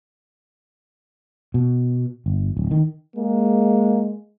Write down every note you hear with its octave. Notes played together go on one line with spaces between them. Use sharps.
B2
G1
D1
D#3
G#3 A#3